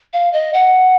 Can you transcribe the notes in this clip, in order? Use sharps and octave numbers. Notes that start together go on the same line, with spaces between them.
F5
D#5
F#5